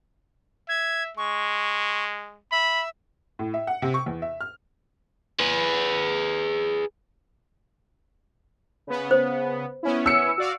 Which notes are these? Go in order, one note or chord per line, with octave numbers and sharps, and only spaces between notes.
E5 G#6
G#3 C#6
E5 B5
A2
E5
F#5
C3
C#6
E2
E5
F6
G#4 B4
C#3 B3
C5
B3 C#4 E4
E6 C#7
F#4 D5 F5